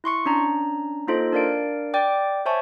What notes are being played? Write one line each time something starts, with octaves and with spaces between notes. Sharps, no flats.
E4 C6 C#6 C#7
C#4 D4 A#5
A#3 D#4 F4 A4 C5 D#5
D4 A#4 D5 F5 D7
D5 G5 D6
C5 C#5 E5 G#5 A5 C#6